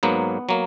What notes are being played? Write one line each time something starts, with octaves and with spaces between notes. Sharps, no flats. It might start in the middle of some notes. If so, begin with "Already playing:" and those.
G#2 F#3 A#3 B3
F#3 A#3